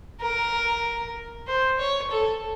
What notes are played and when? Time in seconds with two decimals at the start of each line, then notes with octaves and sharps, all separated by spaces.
0.21 A#4
1.47 C5
1.79 C#5
2.11 A4